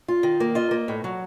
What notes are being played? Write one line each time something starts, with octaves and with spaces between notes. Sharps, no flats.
F4
D#3
A#3
F4 D#5
A#3
A2
F#3